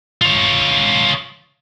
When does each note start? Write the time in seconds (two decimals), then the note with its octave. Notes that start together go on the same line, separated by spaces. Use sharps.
0.21 F4 C#5